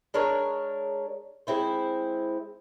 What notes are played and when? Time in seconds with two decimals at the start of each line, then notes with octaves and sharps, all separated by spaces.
0.14 G#3 D4 A#4 C#5
1.47 G#3 C4 E4 C5